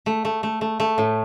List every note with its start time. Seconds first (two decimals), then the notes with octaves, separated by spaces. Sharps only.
0.06 A3
0.25 A3
0.43 A3
0.61 A3
0.80 A3
0.98 A2